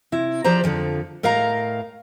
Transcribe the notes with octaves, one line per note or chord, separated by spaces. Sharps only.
C3 E4
F3 G4 C5 D5 A#5
F2 D3 E3 F3
A2 A#4 D#5 F5 A#5